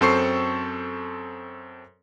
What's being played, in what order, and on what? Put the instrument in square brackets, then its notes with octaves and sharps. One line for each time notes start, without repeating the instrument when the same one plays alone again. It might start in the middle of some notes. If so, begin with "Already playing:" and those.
[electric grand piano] F#2 C4 A4 C5 C#6 C7